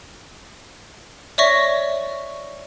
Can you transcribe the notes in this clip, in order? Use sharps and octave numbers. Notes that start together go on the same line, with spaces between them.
C#5 D5 E5 C#6 A#6